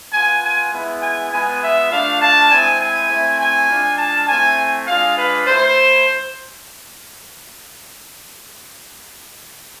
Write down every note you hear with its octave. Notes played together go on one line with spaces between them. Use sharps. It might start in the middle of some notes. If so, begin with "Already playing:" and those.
B3 F4 G#5
G#5
G#3 B3 E4
G#5
G#3 B3 F4 G#5
E5
A3 D4 F4 F5
A5
G#3 C4 E4 G#5
G#5
A3 C4 E4
G#5
G#3 D4 F4
A5
A3 C4 E4 G#5
G#3 D4 F4 F5
B4
A3 E4 C5